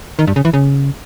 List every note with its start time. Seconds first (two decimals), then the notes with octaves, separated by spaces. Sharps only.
0.19 D#3
0.27 G2
0.36 C#3
0.45 E3
0.53 C#3